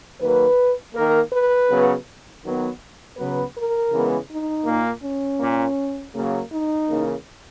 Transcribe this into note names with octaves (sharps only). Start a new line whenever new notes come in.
D#3 F#3 A#3 B4
D#3 A#3 A#4
B4
C#3 F#3 B3
D#3 F#3 B3
C#3 F#3 B3 B4
A#4
C#3 E3 G#3 B3
D#4
A#2 A#3
C#4
A#2 A#3
C#3 F#3 A#3
D#4
C#3 E3 A#3